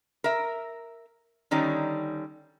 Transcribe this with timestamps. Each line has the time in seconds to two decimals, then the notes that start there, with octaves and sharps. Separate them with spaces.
0.24 A#4 E5
1.51 D3 D#3 G3 C#4 D#4